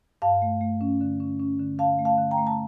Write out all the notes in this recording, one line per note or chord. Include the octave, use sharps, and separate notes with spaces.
G2 F5 A5
A3
A3
C#4
D3
C#4
C#4
D3
D3 F5 A5
A3
F5 A5
D3
G5 A#5
A3
A5